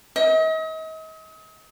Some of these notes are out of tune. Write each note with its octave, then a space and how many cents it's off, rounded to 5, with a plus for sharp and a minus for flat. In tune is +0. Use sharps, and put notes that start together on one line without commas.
D#5 +40